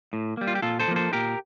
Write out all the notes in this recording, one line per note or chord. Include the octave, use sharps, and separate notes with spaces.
A2
G3 A#3
F4
G4
A#2 F4 A4
A4 C5
F3 A#3
A4 C5
A#2 G4 A#4